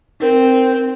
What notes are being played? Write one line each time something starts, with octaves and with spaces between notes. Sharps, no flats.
C4 D#4 A#4